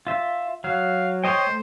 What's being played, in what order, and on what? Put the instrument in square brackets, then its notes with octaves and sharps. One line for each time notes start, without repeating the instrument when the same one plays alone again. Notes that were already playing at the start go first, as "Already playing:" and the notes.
[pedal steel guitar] F4 E5
[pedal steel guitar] F#3 [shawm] F5
[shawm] C5 [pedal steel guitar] C#5 D#5 G5
[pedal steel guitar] A3